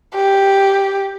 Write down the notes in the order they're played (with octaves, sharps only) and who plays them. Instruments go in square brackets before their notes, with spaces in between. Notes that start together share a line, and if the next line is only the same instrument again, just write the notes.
[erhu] G4